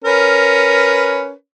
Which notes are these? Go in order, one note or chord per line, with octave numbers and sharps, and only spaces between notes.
C#4 A#4 B4